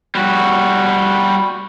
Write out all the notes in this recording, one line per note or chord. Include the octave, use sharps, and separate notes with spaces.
G3 F#4